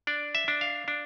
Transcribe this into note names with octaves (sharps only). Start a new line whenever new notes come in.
D4 D5
E5
D4
F5
D4